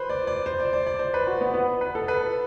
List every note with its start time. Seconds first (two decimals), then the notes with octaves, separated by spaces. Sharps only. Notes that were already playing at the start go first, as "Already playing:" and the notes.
Already playing: B4 C5
0.09 D5
0.27 D5
0.46 C5
0.60 D5
0.73 D5
0.86 D5
0.99 C5
1.14 B4
1.27 F#4
1.41 B3
1.54 B3
1.81 B4
1.95 A4
2.08 B4